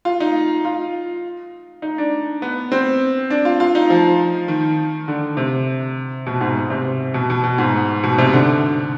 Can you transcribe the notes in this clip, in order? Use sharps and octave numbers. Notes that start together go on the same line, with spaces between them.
F4
D#4
F4
D#4
D4
B3
C4
D4
F4
F4
D#4
F3
D#3
D3
C3
B2
G#2
C3
B2
B2
B2
G#2
B2
C3
D3